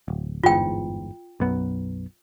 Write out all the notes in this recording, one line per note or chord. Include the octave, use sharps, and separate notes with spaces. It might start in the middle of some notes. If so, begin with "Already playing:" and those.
D1
G1 E2 G#2 F4 G5
B1 F#2 B3